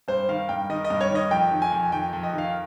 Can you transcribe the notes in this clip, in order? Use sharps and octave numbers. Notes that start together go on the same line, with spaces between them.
G2 C5
D#3 F5
G2 G5
D#3 D#5
D#5
G2
C#5
D#3 D#5
F2 G5
D#3
G#5
F2
D#3 G5
F2
D#5
D#3 F5